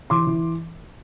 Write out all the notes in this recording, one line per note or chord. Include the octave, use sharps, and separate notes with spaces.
E3 C6 D6
E3